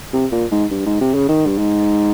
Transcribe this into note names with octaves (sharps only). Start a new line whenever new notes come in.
C3
A#2
G#2
G2
G#2
C3
C#3
D#3
G2
G#2